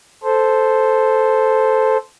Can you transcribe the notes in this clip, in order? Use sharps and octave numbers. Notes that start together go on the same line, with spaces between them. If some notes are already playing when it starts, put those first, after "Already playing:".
A4 C5